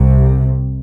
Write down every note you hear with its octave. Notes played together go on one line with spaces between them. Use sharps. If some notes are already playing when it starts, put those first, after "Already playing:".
Already playing: C2 C3